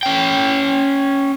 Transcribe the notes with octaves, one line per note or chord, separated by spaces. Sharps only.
C#4 G5